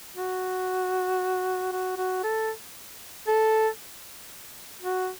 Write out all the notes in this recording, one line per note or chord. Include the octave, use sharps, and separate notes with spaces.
F#4
F#4
F#4
A4
A4
F#4